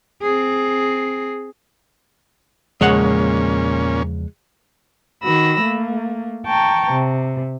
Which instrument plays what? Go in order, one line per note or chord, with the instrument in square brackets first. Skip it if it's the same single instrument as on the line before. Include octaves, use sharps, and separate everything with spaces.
[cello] C4 G#4
[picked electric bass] E2 C#3 F3 [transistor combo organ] A#2 C#4 [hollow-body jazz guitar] G#3 C#5 F#5
[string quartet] D#3 F#4 B5 E6 A#6
A3 A#3
G5 A5 A#5 C#6
C3